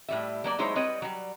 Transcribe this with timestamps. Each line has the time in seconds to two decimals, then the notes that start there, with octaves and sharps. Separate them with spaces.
0.09 A2 G3 E5
0.44 F#3 A#3 D5
0.59 F#3 G#3 D#4 E4 C5 C#5
0.76 G3 C4 B4 C#5 D#5
1.02 F#3 G3